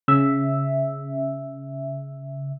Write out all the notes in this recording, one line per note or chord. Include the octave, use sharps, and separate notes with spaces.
C#3 E5